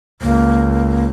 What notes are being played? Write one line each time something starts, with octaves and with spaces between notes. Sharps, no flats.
C#2 A#3